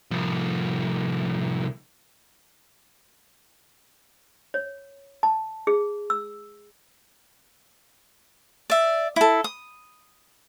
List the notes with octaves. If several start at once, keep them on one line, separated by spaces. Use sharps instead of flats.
C2 F3
C#5
A5
G#4
E6
D5 E5
E4 A4
D#6